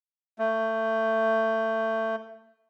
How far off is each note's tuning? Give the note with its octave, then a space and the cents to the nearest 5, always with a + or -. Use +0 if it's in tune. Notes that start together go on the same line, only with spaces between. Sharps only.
A3 +20